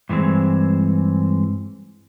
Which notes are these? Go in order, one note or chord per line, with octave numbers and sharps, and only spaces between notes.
G2 E3 G#3 C4